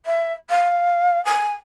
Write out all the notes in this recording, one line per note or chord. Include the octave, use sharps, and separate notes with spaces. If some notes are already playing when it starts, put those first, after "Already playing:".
E5
F5
G#5